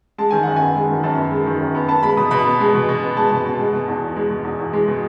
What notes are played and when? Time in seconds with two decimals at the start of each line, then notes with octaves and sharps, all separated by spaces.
0.18 G#3 A5
0.31 D#3 G#5
0.43 F#2 F#5
0.56 B3 G#5
0.75 G#3
0.89 D#3
1.03 F#2 A5
1.17 B3
1.31 G#3
1.46 D#3
1.60 F#2
1.75 B3
1.88 B3 A5
2.03 G#3 B5
2.17 B2 D#6
2.31 B2 B5
2.45 B3
2.60 G#3
2.75 B2
2.89 B2
3.03 B3
3.17 G#3 A5
3.31 B2
3.45 B2
3.59 G#3
3.73 B2
3.88 E2
4.01 E2
4.16 G#3
4.30 B2
4.44 E2
4.59 E2
4.73 G#3
4.88 B2